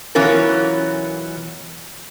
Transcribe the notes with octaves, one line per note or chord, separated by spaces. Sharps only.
B2 E3 F#3 C#4 F4 A#4